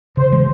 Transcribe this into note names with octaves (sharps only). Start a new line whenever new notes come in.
C#3 C5
E3 G#3